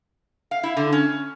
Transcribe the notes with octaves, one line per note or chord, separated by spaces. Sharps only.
F5
E4
D3
C#4